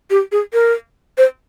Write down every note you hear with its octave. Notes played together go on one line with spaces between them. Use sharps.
G4
G#4
A#4
C5